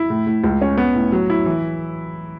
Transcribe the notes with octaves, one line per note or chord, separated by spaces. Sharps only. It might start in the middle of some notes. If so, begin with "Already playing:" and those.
Already playing: E4
A2
A2
C#2
C#4
B3
A2
F#3
E4
E3